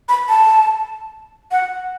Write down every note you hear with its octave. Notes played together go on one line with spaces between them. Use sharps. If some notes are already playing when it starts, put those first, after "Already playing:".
B5
A5
F#5